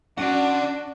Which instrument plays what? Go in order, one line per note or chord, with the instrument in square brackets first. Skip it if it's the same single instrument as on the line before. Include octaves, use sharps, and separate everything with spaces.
[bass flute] C#4 [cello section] D4 [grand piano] F#4 [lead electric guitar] D5 F#5